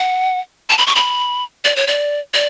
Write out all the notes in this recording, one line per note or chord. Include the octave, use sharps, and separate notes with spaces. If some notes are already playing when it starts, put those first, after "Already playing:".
Already playing: F#5
A5
B5
C#6
B5
D5
C#5
D5
D5